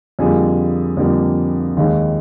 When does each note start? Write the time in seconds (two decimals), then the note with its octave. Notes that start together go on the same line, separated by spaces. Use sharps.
0.19 F2 D3 G3 A#3 G#4
0.97 F2 D3 G3 A#3
1.77 D#2 D#3 G#3